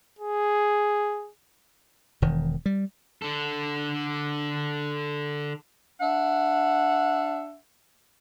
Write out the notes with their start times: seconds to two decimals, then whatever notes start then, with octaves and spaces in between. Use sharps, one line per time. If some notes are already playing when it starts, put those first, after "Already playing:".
0.19 G#4
2.22 E1 D#3
2.66 G3
3.22 D3 A4
6.01 D4 E5 F#5